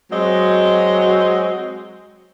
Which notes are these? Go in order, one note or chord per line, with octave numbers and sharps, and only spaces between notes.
F#3 G#3 C4 F#4 D#5